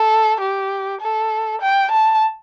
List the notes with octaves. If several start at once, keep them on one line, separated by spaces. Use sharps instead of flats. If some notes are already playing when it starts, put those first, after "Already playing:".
Already playing: A4
G4
A4
G5
A5